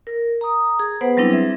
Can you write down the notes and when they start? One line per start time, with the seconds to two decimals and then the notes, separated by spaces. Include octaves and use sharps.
0.07 A#4
0.41 A#5 D#6
0.79 G#4
1.01 B3 B4 C5 F#5
1.17 F#3 G3 C4 D4 E4
1.31 G#4 E5